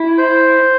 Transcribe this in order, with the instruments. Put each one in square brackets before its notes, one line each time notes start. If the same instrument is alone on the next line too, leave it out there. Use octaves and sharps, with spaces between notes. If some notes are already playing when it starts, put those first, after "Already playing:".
Already playing: [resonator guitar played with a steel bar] E4
[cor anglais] C5